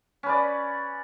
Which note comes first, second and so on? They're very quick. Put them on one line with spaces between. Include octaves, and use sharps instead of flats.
C#4 B4 D5